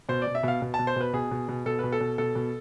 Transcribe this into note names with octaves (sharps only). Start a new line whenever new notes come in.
B2 C5
B2 D5
E5
B2 F5
B2
A5
B2
C5
B2 B4
B2 G#4
B2
B2
B2 A4
B2 B4
A4
B2
B2 A4
B2